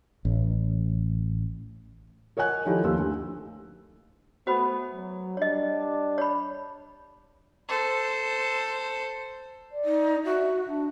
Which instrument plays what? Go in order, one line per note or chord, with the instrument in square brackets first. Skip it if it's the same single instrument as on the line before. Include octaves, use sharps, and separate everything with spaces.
[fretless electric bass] A1
[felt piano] A#4 C#5 D#5 F#5 G#5 F#6
D#3 F3 D#4 E4 G4 A4
D#2 F3 F4 G4 E6
D2
[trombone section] A3 B3 [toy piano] F#4 C5 B5
[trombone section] F#3
[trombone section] G3 D4 [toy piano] C#5 D#5
[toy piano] C#5 B5
[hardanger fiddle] A4 C5
[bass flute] D5
[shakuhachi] D#4
[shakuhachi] F#4 [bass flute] E5
[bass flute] D4